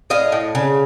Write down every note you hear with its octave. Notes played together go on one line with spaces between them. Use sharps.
A2 D#5 F5
A2
C#3